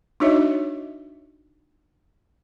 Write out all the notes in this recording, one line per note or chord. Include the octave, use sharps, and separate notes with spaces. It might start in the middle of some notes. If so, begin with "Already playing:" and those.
D4 D#4 F#4 C#5 D#5 E5